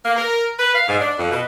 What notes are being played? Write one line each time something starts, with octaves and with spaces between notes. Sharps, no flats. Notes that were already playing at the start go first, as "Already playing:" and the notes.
A#3
A#4
B4
F5
G#2
D4
F2
B2